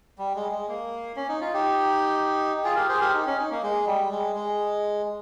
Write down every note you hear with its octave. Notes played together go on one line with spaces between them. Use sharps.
G3
G#3
G#3
A#3
C#4
D#4
F4
D#4 G4
F4 G#4
G4 A#4
G#4 C5
G4 A#4
D#4
C#4
D#4
A#3
G#3
G3
G#3
G#3